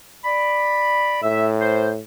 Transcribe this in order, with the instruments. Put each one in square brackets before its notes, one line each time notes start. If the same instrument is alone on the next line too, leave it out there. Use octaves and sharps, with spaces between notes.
[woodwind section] D5 B5
[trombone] A2 [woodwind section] E5
[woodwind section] C5